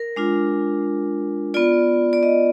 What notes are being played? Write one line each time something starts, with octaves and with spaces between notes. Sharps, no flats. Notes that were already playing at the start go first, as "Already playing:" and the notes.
Already playing: A#4
G#3 D4 F4
B3 F4 D5
D5
D#5